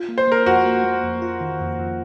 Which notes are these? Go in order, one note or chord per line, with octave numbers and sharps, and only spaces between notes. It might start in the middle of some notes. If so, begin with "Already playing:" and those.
Already playing: F4
A#3
C5
A#3 A#4
F2 F#4
A#3
A#3
F2
F4
D#3
F2
F2